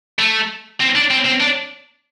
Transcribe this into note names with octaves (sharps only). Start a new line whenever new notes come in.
A3
C4
D4
C4
C4
D4